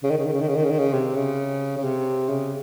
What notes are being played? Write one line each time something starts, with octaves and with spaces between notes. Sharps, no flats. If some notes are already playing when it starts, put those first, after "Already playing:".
C#3
D#3
C#3
D#3
C#3
D#3
C#3
D#3
C#3
D#3
C#3
C3
C#3
C#3
C3
C#3